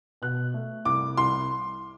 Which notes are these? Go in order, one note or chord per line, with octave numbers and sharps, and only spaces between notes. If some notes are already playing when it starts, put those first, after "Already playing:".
B2 F#6
A3
C2 D6
C2 C6